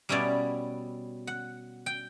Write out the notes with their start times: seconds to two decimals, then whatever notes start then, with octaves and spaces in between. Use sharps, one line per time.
0.09 B2 G3 C#4 E4 D5
1.27 F#5
1.86 G5